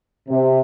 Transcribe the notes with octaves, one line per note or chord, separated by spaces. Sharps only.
C3